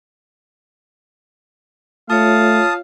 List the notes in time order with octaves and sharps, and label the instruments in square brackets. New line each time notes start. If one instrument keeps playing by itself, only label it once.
[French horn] A3 [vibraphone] F4 C#5 [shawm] F5 [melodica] A5 D#6